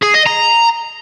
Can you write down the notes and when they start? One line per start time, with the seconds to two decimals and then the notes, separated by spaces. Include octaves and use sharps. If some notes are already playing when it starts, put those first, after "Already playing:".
0.03 G#4
0.15 D#5
0.27 A#5